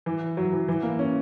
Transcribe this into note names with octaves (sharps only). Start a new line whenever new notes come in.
E3
F#3
E3
E3
A#3
C#4